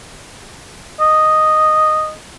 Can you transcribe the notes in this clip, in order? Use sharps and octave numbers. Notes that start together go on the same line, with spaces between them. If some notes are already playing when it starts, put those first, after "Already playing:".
D#5